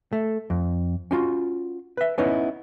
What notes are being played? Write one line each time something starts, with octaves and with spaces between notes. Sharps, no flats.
A3
F2
C#4 D#4 F4 F#4
B4 E5
B3 C#4 D#4 E4 B4 C#5